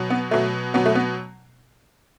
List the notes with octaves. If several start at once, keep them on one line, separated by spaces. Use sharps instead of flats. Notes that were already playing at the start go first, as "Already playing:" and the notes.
Already playing: B2 F#3
B3
B2 F#3 A3
B2 F#3 B3
A3
B3